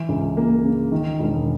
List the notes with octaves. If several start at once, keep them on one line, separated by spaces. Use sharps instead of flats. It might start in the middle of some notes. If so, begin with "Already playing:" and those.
Already playing: E3
C#2
A#3
C#3
D#3
E1